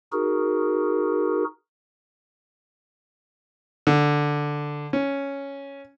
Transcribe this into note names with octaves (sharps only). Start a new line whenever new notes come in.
D#4 F#4 G#4 A#4
D3
C#4